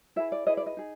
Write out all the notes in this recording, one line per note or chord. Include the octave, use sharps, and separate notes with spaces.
E4 G#4 B4 E5
D5
E4 G#4 B4 D#5
D5
D#5
D#4 G#4